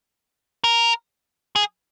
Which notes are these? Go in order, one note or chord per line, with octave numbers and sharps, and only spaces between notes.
A#4
G#4